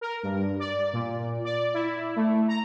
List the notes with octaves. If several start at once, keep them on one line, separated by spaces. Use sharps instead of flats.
A#4
G2
D5
A#2
D5
E4
A3
A#5